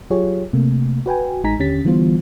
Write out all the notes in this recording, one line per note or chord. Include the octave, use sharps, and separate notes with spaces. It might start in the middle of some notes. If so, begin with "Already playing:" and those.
F#3 F4 G4 G#4 C#5
C3 A3 A#3
F#4 B4 G5 G#5
A1 G#3 D#4 G#5 A#5 B6
D#2 D3 C#4 G4 A6 B6
D3 E3 G3 B3 F4 C5